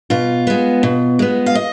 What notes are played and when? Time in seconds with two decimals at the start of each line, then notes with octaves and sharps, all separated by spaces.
0.10 B2 F4
0.47 G#3 B3
0.83 B2
1.19 G#3 B3
1.46 F5
1.55 D#5